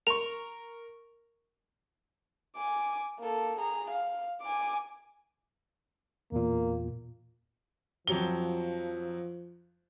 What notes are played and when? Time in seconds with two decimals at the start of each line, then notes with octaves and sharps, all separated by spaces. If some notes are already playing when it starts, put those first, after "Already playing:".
0.07 A#4 C#6 F7
2.56 G#5 D6
3.19 A#3 A4
3.59 G#4 A#5
3.91 F5
4.42 G#5 D6
6.32 E2 A#2 A#3
8.07 F2 F3 F#3 G7